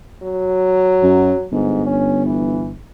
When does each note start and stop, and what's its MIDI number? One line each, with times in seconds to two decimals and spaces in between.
0.23 1.45 54
1.03 1.33 42
1.52 2.82 31
1.52 1.86 44
1.86 2.22 61
2.26 2.70 52